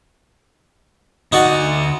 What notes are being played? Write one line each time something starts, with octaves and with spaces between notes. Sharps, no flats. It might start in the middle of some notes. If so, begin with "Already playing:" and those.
D2 D#4 F#4 D5 F#5